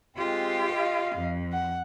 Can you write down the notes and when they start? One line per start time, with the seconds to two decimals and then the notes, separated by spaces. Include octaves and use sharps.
0.17 G#3 C4 F4 G4
0.73 D#5 F5
1.15 F2
1.53 F#5